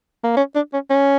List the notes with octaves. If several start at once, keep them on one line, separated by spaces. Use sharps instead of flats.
A#3
C#4
D4
C#4
C#4